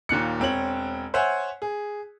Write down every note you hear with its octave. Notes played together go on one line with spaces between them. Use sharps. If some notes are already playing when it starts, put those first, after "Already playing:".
D#2 A#2 F#6 C#7
E1 C4 C#5 F#7
C5 C#5 E5 F#5 G#5
G#4